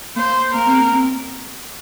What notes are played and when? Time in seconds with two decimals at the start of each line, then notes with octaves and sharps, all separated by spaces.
0.16 A#3 C5
0.53 A#3 A#4
0.67 C4
0.80 A#3
0.93 C4